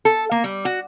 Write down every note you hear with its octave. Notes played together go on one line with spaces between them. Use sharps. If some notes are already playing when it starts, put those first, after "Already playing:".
A4
A#3
G3
F#4